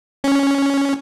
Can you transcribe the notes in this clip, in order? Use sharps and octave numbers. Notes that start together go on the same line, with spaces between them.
C#4